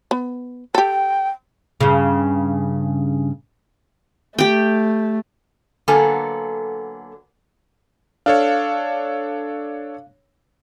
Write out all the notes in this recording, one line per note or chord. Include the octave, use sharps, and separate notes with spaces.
B3
G4 A4 G5
G2 C#3
A3 G4 G5
D3 F#3 A#3 B3 A4 G#5
D4 A4 C#5 F5